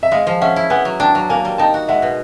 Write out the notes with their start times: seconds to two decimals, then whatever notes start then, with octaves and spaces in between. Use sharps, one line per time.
0.03 E5
0.12 G#3 D#5 F5
0.27 F3
0.41 C#4 E5 F#5
0.56 E4
0.70 B3 F#5 G#5
0.85 F#3
1.00 D4 G5 A5
1.15 F#3
1.29 A#3 G#5 A#5
1.45 G3
1.58 D#4 G5 A5
1.74 F#4
1.88 G#3 E5 F#5
2.02 B2